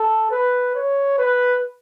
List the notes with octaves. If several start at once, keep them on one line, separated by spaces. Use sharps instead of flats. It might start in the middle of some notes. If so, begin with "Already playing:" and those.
Already playing: A4
B4
C#5
B4